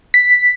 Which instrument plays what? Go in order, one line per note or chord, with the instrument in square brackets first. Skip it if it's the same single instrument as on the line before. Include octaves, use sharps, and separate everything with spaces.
[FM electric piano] B6